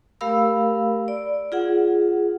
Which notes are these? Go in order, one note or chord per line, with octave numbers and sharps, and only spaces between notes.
A3 G4 A#4 F5 B5 E6
D5
F4 G#4 F#5